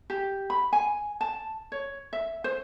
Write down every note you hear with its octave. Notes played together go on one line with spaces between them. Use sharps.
G4
B5
G#5
A5
C#5
E5
C5